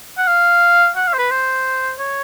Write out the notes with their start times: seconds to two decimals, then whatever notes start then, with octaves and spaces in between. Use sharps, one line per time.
0.18 F#5
0.28 F5
0.96 F#5
1.08 F5
1.14 C5
1.19 B4
1.31 C5
1.99 C#5